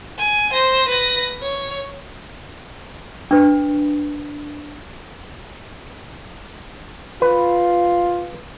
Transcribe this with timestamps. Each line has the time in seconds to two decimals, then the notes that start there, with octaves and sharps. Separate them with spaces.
0.18 G#5
0.53 C5 A#6
0.89 B4 A#6
1.42 C#5
3.31 D4 B4
7.22 F4 B4